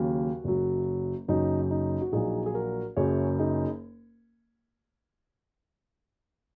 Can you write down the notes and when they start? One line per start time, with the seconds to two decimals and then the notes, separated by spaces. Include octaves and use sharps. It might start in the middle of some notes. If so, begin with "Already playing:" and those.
Already playing: D#2 C#3 F#3 F#4
0.44 F#1 F#2 F#3
1.28 F#1 F#2 F#3 D#4
1.71 D#4
2.02 F#4
2.12 A#1 A#2 F#3 D#4 G#4
2.46 G#4
2.54 F#4 A#4
2.97 F#1 F#2 F#3 G#4 C#5
3.39 D#4 G#4